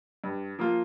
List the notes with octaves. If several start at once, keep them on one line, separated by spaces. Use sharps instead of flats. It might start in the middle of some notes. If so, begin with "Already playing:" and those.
G2
F3 A#3 F4